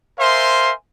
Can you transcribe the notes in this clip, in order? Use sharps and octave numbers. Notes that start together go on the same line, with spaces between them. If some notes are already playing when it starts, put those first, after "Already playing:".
A#4 C5 E5 F5 G#5 C6